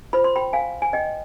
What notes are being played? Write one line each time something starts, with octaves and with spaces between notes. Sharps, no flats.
F4 C5 B5
C6
G5 B5
F5 G#5
G#5
D#5 G5